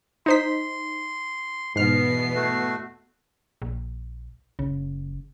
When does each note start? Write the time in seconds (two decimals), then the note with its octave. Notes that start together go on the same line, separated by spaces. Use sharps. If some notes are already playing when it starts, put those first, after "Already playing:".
0.26 D#4 C5 C6 B6
1.76 E2 G#2 B2 B3 F6 C7
2.34 A3 F#4
3.62 A#1
4.59 F#1 C#3